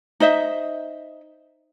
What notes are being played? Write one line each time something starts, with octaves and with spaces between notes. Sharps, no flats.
D#4 C5 D#5 E5